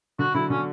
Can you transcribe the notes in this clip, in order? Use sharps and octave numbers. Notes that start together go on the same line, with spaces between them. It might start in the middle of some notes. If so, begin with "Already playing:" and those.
D3 F#4
D3 F#3 E4
D3 F#3 C#4